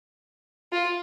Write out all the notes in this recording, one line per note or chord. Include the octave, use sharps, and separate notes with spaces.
F4